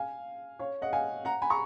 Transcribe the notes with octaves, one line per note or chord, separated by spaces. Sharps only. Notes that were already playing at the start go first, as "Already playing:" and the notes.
Already playing: F5 G#5
C#5 F5
D#5 F#5
F5 G#5
F#5 A#5
G#5 B5
A#5 C#6